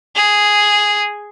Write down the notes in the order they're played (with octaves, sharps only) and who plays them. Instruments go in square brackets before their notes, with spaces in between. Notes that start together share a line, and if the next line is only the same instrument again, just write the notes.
[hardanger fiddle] G#4